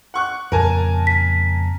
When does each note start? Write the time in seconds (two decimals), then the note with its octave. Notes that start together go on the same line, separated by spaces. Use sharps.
0.14 F#5 C#6 F#6
0.52 F2 A#2 C#3 A#4 G#5 A5
1.07 B6